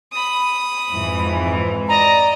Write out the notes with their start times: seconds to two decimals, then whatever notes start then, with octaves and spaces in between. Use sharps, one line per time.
0.12 B5 D#6
0.91 F2 G#2 E3
1.88 D5 D#5 A#5